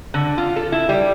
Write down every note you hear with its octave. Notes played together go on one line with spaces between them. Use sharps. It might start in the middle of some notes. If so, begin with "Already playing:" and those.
D3
F4
A4
E4
G3